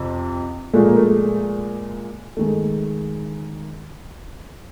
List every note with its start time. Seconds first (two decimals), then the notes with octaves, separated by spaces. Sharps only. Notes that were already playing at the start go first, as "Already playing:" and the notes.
Already playing: F2 C3
0.73 A#2 F3 G#3 A3
0.84 A#3
0.96 A3
2.37 D#3 G#3 A3